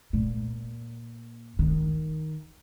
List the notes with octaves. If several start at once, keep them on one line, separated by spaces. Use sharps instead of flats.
A#2
D#3